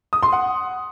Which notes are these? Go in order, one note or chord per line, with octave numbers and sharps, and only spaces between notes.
D#6
C6
F#5